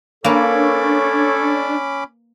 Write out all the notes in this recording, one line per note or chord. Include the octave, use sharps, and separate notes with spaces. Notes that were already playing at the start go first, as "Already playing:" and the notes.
A#3 C#4 D4 A4 B4 C#5 B5 D6